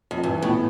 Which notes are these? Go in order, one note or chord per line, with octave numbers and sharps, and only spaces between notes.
F2
G2 E3
A2 B3